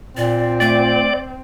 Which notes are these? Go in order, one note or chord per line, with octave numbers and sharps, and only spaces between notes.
A#2 C4 D5
A3 D5